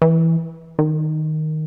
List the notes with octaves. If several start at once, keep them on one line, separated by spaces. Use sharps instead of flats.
E3
D#3